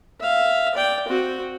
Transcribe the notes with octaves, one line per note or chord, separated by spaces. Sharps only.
E5 F5
D5 G5
C4 F#4